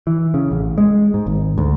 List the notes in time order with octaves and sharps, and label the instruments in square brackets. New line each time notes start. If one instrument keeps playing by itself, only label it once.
[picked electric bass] E3
C#3
A1
G#3
G#2
G#1
D2